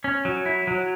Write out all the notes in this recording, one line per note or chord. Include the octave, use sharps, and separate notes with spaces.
C#4
F#3
E4
F#3